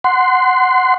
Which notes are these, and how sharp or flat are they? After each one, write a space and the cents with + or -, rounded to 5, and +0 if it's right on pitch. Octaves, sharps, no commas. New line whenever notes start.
F#5 +0 C6 -15